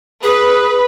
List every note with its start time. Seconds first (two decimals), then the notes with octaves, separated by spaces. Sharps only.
0.23 G#4 B4